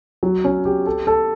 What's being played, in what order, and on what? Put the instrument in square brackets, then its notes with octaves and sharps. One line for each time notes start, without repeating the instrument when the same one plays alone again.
[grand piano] F#3
C#4
G4
A4
A4